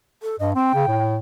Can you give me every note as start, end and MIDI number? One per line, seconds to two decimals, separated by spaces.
0.23 0.36 69
0.40 0.55 43
0.40 0.50 75
0.55 0.70 60
0.55 1.14 79
0.75 0.85 49
0.87 1.18 45